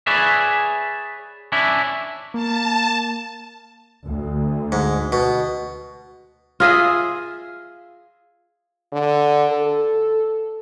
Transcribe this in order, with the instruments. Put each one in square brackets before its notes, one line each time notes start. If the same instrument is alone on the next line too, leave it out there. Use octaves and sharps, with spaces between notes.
[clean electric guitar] G#4 B4 C#5 D5 E5
C#4 D4 E4 E5
[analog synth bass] A#3 [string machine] A5
[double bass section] D2
[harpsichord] G#2
B2
[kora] F4 G#4 D#5 E5
[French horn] D3
A4